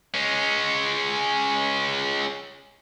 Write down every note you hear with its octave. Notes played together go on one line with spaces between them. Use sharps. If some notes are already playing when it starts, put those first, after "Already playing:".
G#3 C#4